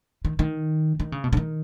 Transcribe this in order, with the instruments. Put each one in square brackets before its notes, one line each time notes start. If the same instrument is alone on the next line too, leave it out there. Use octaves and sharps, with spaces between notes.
[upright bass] D#3
D#3
D#3
C#3
B2
C#3
D#3